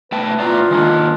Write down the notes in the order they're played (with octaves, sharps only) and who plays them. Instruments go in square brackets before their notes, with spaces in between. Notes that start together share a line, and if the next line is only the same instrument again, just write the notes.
[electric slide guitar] A3 G5 A5 [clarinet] B4
[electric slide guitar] A2 D5 A#5 [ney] F4
[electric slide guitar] D#3 G#3 A#3 [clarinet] D4